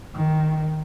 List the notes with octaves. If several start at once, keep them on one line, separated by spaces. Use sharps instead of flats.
D#3